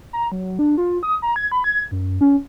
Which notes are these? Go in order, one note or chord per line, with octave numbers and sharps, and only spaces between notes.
A#5
F#3
D4
F4
D#6
A#5
G#6
B5
G#6
F#2
C#4